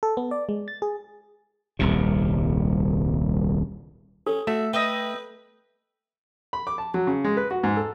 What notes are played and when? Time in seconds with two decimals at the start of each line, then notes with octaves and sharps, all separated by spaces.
0.03 A4
0.17 B3
0.31 D5
0.49 G#3
0.68 A6
0.82 G#4
1.79 D#1 C2 C3
4.27 C#4 A4
4.47 A3 F#4 E5
4.73 B4 D#5 E5 G5
6.53 B5
6.67 D6
6.78 A5
6.94 F#3
7.07 C#3
7.24 G#3
7.37 B4
7.51 F#4
7.63 G#2
7.76 A4